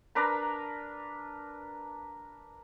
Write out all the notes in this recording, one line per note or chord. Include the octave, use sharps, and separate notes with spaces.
D4 A#4 B4 A#5